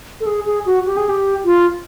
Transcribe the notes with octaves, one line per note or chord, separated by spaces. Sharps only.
A4
G#4
G#4
F#4
G4
G#4
G4
F4